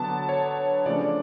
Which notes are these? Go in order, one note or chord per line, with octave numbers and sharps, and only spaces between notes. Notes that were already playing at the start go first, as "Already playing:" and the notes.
Already playing: D3 F#3 B3 D4 A5
C#5
C#3 F3 A3 D4 D5
D5